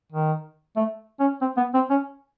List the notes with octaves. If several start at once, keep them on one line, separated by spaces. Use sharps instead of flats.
D#3
A3
C#4
C4
B3
C4
C#4